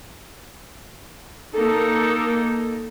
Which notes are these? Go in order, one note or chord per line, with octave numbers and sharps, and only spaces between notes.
A#3 D#4 A4